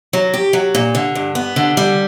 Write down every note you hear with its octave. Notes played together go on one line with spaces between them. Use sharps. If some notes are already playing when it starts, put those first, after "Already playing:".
F#3
G4
F#3
A#2
D3
G2
B3
D3
G3